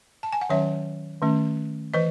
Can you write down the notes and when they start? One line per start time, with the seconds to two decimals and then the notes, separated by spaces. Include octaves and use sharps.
0.23 A5
0.33 G#5
0.41 F#5
0.50 D#3 F#3 C#4 C#5 E5
1.22 D#3 A3 C#4
1.94 E3 B4 D#5